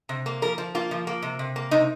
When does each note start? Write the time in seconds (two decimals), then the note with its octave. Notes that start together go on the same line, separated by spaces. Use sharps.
0.09 C3
0.26 A#3
0.42 F3 A#4
0.58 F3
0.75 A#3 F4
0.91 F3
1.07 A#3
1.22 C3
1.39 C3
1.56 A#3
1.71 C3 D#4